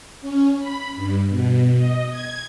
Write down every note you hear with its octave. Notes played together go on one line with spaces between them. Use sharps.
C#4
B5
G2
B2
D#5
G#6